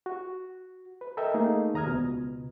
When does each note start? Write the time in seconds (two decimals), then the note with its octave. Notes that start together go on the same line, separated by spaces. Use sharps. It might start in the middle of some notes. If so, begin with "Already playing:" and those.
0.06 F#4
1.01 B4
1.17 A4 A#4 D#5 E5 G5
1.34 A3 A#3 D#4 G#4
1.74 D#2 A#5 D#6 F6 G#6
1.87 C#2 B2